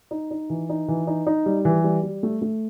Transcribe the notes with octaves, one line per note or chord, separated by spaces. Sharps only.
D#4
D#4
E3
D#4
E3
D#4
D#4
G3
E3
G3
G3
A3
A3